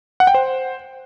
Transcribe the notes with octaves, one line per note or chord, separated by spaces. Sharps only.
F#5
G5
C5